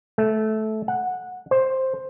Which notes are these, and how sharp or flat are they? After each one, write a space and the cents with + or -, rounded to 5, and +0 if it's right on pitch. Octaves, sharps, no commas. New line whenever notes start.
A3 -15
F#5 -15
C5 +5